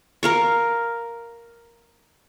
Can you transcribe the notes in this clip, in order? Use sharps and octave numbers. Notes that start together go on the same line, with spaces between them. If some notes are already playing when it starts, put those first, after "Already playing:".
A#4 F5 C#6